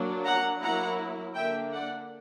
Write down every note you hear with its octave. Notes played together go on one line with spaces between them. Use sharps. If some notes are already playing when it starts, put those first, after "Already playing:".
Already playing: F#3 A#3 D4
F#5 A#5
F#3 A#3 E4 F#5 A#5
D3 A#3 D4 E5 G5
D5 F#5